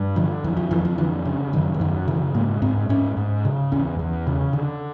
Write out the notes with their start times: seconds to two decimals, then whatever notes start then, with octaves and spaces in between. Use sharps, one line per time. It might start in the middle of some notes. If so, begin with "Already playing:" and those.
Already playing: G2
0.16 D3 F3
0.44 F2 E3
0.57 F3
0.71 F2 E3
0.85 F3
0.98 D3 E3
1.25 C#3
1.53 F#2 D#3
1.74 E3
1.80 F#2 D#3
2.07 C#3 E3
2.34 G#2 A#3
2.62 G#2 C4
2.89 G#2 C#4
3.17 G#2
3.45 C#3
3.72 E2 C#4
3.99 E2
4.27 C#3
4.53 D3